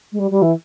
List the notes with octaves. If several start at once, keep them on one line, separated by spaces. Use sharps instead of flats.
G#3
G3
G3
E3